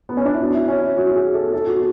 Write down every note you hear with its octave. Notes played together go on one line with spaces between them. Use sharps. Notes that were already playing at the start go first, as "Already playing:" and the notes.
B3
C#4
D4
E4
F#4
E4
C#4
E4
F#4
G#4
A4
A4
F#4